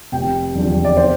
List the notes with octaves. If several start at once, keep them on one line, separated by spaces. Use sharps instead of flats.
F1 G5
E2 D3 F3
D5
C5